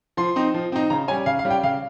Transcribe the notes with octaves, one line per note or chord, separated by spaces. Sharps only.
F3 C6
C4 D#4
F3
C4 D#4
C#3 A#5
G3 C#4 G#5
C#3 F5
F5
G3 C#4
G5
C#3 F5